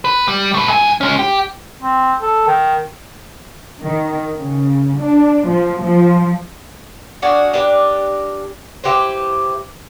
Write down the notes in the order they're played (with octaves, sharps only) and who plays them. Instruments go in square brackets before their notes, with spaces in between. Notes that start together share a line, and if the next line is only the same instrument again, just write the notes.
[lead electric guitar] B4
G3
A3 B4
G2 G#5
G#3 C#4
G4
[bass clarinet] C4
A4
D#3
[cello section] D#3
C#3
D4
F3
F3
[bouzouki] D4 F#4 G#4 A#4
D4 G4 A#4 B4
E4 G4 B4 C5